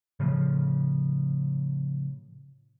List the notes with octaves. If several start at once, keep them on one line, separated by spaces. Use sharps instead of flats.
A2 C#3 F3